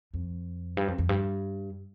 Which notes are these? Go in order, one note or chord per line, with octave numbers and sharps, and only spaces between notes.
F2
G2
F2
F2
G2